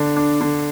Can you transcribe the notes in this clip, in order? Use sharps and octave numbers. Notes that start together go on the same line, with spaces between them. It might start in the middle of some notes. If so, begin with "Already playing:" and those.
Already playing: D3 D4
D4
D3